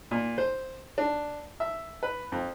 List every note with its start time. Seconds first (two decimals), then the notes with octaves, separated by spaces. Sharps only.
0.11 A#2
0.38 C5
0.98 D4
1.60 E5
2.03 B4
2.32 F2